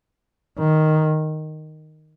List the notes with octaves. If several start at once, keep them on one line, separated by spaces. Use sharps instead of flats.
D#3